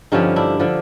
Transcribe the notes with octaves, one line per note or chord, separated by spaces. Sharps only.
G2 D3 F3 C#4 D#4
D4 E4
D3 F3